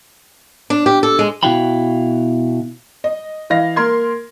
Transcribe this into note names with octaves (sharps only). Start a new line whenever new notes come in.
D4
G4
A4
G#3
B2 E4 F#4 F5 G5 B5
D#5
E3 D#5 F5 A#6
A#3 A#4 C6 G#6